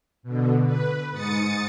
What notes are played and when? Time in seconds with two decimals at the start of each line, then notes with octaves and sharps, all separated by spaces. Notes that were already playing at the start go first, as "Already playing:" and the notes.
0.23 B2 D3
0.65 B4
1.12 G#2 D#6 A6 C#7